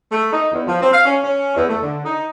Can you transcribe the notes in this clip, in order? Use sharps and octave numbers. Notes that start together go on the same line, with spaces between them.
A3
D#4
E2
F3
C4
F5
C#4
C#4
E2
A3
D3
D#4